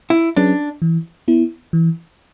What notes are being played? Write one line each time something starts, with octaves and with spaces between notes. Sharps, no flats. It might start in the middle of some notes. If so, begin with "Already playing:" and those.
E4
F#3 C#4 D4 G#4 B4
E3
B3 E4
E3